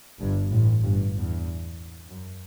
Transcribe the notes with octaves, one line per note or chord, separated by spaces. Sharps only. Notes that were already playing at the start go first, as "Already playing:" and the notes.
G1 G2
A1 A2
G1 G2
E2
F#2